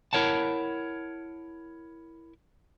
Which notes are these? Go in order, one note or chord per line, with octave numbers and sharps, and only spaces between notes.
E4 A#4 C#5 F#5 A5